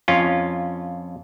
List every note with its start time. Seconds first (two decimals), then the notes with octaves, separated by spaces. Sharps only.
0.08 F2 C#4 F4